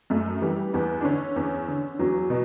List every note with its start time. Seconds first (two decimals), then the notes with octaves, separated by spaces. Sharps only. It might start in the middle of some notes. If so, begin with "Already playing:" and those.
0.10 F#2 A3
0.42 E3 G3
0.73 E2 B3
1.01 D4
1.05 D3 C#4
1.36 E2
1.68 D3
1.99 E2 F#3
2.30 B2